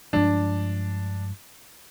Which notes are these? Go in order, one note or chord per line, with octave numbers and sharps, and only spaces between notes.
G2 F3 G#3 D4